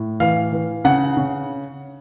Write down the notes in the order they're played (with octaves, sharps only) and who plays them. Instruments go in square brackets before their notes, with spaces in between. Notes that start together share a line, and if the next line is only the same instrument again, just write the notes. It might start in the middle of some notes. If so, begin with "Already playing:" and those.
Already playing: [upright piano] A2
E3 F5
E3
C#3 F#5
C#3